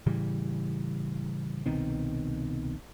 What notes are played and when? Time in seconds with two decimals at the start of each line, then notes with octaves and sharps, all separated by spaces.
0.06 A2 C#3 E3 G3
1.66 C2 B2 D#3 C4